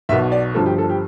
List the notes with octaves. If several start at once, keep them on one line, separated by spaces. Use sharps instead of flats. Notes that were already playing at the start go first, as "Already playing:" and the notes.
B1 B2 E5
D5
G1 G2 F3 A4
G4
A4
G4